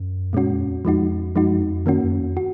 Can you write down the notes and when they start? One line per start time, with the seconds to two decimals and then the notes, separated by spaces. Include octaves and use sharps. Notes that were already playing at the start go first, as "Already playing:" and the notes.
Already playing: F#2
0.33 F2 A#2 G#3 C#4 F#4
0.43 F#2
0.51 F2
0.67 F2
0.85 F2 F3 G#3 D#4 F#4
1.36 F#2 F3 G#3 D#4 F#4
1.61 F2
1.86 F#2 D#3 A#3 C#4 F#4
2.04 F#2
2.20 F2
2.37 F#4